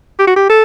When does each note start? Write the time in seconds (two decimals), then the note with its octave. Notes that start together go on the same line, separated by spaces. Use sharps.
0.19 G4
0.27 F#4
0.36 G4
0.49 A4